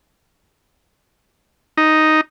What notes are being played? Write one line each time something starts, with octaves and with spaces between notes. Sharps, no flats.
D#4